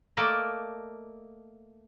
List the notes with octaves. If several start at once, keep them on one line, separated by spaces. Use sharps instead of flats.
A3 A#3 A#4 D5 D#5 A5